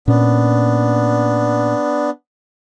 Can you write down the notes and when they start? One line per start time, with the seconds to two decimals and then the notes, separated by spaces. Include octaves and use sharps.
0.08 A#2 B3 C#4 D4